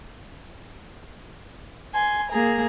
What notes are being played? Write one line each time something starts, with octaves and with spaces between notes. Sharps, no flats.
G#5 C6
A#3 G#4 A#5